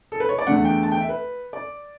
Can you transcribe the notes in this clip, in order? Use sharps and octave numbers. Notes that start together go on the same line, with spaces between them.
A4
B4
C#5
D5
E2 D3 A3 F#5
G5
A5
G5
E5
B4
D5